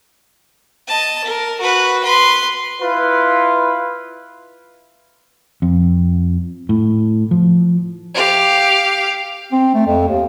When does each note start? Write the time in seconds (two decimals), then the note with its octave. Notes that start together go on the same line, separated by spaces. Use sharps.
0.88 D#5 A5
1.25 A#4
1.61 F#4 B4
2.04 B4 C6
2.81 E4 F4 B4
5.62 F2
6.69 A2
7.31 F3
8.15 G4 F5
9.52 C4
9.74 A3
9.86 F2
10.07 D#2